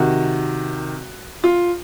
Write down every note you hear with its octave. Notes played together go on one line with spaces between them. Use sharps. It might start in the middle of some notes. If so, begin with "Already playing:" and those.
Already playing: C3 D#3 F#4
F4